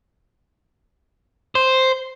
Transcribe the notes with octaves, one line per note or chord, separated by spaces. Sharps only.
C5